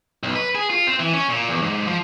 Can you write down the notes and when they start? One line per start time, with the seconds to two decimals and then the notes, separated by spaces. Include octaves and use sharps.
0.23 B1
0.35 B4
0.55 G#4
0.70 F4
0.87 C4
1.00 E3
1.13 C#4
1.29 A#2
1.48 E2
1.62 G#2
1.87 F3